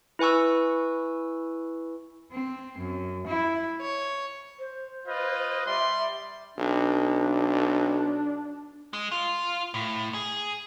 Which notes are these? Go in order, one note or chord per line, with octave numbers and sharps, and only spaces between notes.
E4 B4 G#5 C#6 E6
C4
F#2
E4
C#5
C5
F4 B4 D#5
G3 D5 E5 C6
B1 D4
G#3
F4
A2
G#4